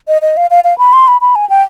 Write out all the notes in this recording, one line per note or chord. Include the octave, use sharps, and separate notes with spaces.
D#5
D#5
F5
F5
F5
B5
C6
B5
B5
G#5
G5